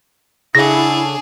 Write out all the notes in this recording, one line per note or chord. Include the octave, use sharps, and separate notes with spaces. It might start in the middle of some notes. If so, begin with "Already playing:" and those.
C#3 D4 E4 G#4 A4 F#5 A#6